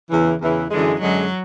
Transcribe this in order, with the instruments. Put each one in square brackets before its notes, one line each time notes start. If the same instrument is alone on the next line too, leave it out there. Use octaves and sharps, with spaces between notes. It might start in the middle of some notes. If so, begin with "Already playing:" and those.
[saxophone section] E2 C#3 E3
E2 C#3 E3
[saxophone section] F#2 D3 G#3 [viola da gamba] E3
[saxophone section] F#2 D3 G#3 [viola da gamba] F#3